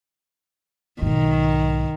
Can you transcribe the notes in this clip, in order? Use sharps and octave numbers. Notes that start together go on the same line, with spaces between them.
B1 G#2 D#3